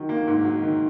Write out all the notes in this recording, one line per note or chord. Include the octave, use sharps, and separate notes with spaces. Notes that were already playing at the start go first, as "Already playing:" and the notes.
Already playing: D#3 F#3
A#3
G#2
F#3
D#3